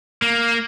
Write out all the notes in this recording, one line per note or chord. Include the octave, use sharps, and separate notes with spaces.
A#3